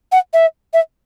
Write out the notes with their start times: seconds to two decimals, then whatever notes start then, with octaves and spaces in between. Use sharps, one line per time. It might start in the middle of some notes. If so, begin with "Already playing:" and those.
0.12 F#5
0.33 E5
0.73 E5